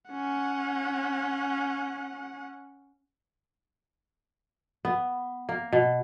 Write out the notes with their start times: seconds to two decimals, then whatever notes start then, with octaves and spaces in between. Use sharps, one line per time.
0.11 C#4 F#5
4.85 B3
5.49 A#3
5.72 B2